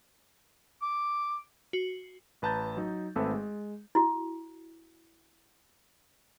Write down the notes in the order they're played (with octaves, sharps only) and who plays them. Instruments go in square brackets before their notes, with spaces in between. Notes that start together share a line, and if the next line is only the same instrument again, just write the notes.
[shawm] D6
[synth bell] F#4
[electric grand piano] A1 B4 A5 A#5 G6 A6
F#3 D#4
G#1 A3 C4 A4 B4 E5
G#3
[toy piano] E4 F#4